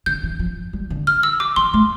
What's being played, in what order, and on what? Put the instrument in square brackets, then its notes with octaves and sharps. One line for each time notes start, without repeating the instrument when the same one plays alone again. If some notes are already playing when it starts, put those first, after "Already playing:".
[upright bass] D3 [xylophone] G6
[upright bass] E3
F3
G3
D3
[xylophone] F6
E6
D6
[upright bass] E3 [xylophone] C6
[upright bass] A3